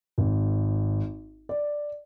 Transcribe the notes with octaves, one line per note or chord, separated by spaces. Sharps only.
G#1
D5